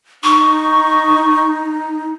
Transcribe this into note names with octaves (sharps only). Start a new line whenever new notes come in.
D#4 C#6